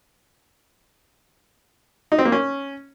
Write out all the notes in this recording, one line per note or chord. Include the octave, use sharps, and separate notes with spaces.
D#4
C4
A#3
C#4